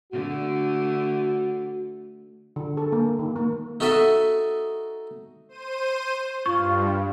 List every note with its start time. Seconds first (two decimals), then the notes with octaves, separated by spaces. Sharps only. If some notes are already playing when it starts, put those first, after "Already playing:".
0.13 D3 A3 F#4
2.56 D3
2.77 A4
2.92 A#3
3.19 D#3
3.36 A#3
3.80 D#4 F#4 A4 D#5 E5
5.49 C5 D#7
6.46 G2 F4 C#6